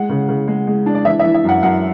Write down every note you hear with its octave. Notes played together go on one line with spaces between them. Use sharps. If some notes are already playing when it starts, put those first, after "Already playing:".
Already playing: G#3 F#5
C#3
C#3
G#3
G#3
D4
D5
E3 E5
E5
E3
E5
F#2 F#5
F#2 F#5